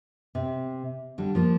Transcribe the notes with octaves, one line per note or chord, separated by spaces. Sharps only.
C3
D3 G3
F3 A#3